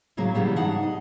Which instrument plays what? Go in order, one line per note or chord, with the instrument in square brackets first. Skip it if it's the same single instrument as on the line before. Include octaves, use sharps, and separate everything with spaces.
[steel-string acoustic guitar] A2 C#3 F#3 A#3
C#3 E3 F#3 G3
G#2 D4 D#4 F#5
D#5